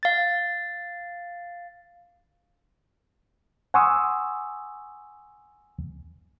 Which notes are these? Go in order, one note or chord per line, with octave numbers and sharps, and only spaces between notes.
F5 A6
F#5 G#5 C6 C#6 D#6 E6